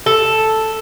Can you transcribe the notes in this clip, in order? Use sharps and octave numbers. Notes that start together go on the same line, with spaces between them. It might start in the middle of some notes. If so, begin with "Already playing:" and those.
A4